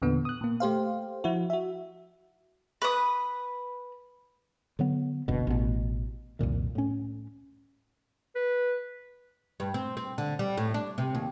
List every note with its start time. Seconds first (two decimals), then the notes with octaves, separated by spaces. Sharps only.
0.02 E2 A#2 D3 B3
0.25 D#6 F#6
0.41 A#2 A#3
0.60 A3 G4 C5 F5
1.24 F3 E4 F#4
1.50 F#4 E5
2.82 B4 D#6
4.79 D3 F#3 B3
5.28 F#1 D2 B2
5.47 A1 B2
6.39 C2 F2 A#2 D#3
6.75 A2 C#4
8.35 B4
9.60 G2
9.74 C4
9.97 C4
10.18 D3
10.39 G3
10.57 A2
10.74 D4
10.98 C3
11.15 D#2